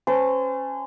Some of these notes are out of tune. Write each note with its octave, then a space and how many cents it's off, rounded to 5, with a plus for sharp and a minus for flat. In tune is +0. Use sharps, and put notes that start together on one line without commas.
C#4 -20 C5 -35 A5 +0